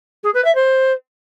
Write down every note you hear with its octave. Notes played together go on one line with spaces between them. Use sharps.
G#4
B4
E5
C5